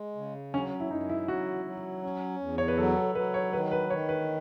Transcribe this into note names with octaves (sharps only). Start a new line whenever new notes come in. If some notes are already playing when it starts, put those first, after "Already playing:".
Already playing: G#3
C#3
F#3 C#4
E4
F#2 D#4
E4
F#3 F#4
F#3
C#4
E2
C#5
B4
F#3 A4
A4
F#3 B4
C#5
D#3 B4
B4
D#3 C#5
B4